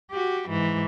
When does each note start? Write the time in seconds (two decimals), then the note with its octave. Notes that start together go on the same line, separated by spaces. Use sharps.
0.11 F#4 G4
0.49 G#2 E3